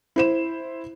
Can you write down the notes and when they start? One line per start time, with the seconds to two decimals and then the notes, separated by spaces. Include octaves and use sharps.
0.16 E4 C5 E7